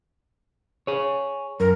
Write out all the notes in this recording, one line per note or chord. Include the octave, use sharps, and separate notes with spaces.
G#4 C#5
F#2 A#4